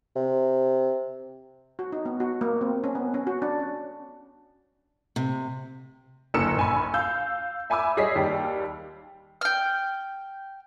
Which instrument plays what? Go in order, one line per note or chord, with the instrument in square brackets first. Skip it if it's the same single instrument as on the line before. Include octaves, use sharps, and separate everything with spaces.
[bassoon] C3
[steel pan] F#4
D#4
B3
F#4
A#3
C4
C#4
B3
C#4
F#4
D4
C#4
[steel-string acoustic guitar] C3
[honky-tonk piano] F#1 D2 A#3 E6 C#7 E7
A#1 G#5 B5
F5 E6 G6
E5 G#5 B5 D6 E6
G3 G#4 C#5 D#5 B6 C7
D#2 G3 G4
[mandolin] G5 F6